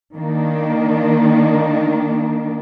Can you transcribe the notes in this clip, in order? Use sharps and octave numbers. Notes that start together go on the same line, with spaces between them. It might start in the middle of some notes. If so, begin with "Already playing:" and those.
D#3 A#3 D4